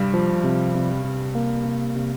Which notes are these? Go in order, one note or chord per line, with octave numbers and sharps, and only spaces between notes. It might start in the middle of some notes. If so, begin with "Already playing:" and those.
Already playing: G2 C3 G3
F3
C3
C3
C3
A#3
C3
C3